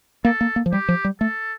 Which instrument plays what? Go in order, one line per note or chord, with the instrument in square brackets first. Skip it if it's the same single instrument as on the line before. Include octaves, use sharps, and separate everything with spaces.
[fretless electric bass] A#3 [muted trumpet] A4
[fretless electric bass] A#3
A#3
F3
[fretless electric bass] G3 [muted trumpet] G4
[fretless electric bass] F3
G3
[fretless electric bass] A3 [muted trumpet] A4